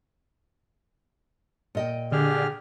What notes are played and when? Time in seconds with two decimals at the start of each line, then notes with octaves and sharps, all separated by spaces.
1.75 A#2 D#5 G5
2.12 D3 G4 G#4 F6